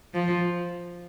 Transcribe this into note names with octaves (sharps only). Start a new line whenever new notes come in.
F3